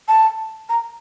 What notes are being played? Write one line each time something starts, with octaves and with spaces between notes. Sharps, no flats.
A5
A#5